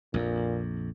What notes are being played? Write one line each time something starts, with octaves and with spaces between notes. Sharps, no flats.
A#1 F2 A#2